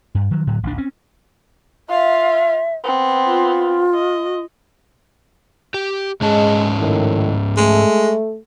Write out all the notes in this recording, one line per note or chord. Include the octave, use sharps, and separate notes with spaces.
G2
D#3 F3 F#3
A2 D3 F#3
A1 D2 D4
C4 C#4
F4 E5 F5
B3 C4
F4
D#5
G4
G#2 G#3 C#4 A5
A2 D#3
G#3 A3